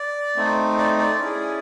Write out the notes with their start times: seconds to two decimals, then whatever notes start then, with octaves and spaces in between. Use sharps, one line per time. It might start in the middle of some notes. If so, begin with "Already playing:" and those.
Already playing: D5
0.36 A3 C4 D#4
0.77 D5
0.99 D5
1.18 C#4 E4 G#4